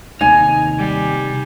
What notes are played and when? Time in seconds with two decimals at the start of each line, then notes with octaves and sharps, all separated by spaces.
0.21 D#2 C3 D#4 G#5
0.78 G3